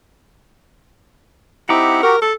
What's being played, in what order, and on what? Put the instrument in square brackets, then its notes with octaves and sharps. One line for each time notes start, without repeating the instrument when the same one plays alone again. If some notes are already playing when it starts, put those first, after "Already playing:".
[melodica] C4 D#4 G4 [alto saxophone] E4 [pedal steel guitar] F#5 A#5 D6
[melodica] F#4 G4 [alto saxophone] A#4
[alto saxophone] A4 [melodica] A5